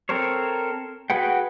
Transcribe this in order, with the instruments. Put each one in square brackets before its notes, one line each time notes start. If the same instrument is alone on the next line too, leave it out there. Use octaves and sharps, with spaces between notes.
[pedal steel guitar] C4 A4 A#4 C5 C#5
F#4 G#4 B4 F#5 G5